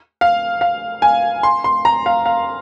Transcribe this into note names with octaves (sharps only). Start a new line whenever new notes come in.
F5
F5
G#5
C6
C6
A#5
F5
F5